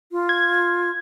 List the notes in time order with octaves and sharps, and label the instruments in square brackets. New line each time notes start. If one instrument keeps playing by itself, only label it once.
[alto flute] F4
[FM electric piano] G#6